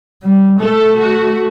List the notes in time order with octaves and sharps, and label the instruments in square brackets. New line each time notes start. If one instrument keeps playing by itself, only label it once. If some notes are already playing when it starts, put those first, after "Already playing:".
[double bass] G3
[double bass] A3 [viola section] A4
[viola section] F#4